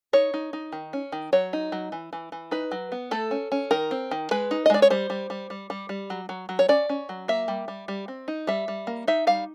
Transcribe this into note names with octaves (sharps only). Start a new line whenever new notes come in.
D#4 C#5
D#4
D#4
D#3
C#4
D#3
F#3 C#5
D#4
F#3
E3
E3
E3
D#4 B4
F#3
B3
A3 A4
C#4
C#4
D#3 A#4
C4
D#3
G#3 B4
D#4
D#5
G#3 D5
C#5
G3 C5
G3
G3
G3
G3
G3
F#3
F#3
F#3
C#5
C#4 D5
C#4
F#3
A#3 E5
G3
G3
G3
C4
D#4
G3 E5
G3
A#3
D#4 E5
G3 F5